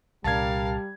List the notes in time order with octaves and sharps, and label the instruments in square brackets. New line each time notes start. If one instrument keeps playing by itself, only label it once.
[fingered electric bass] C2 A#2 C#4 [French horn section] G3 [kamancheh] A#4 F5 [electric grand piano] A5 G#6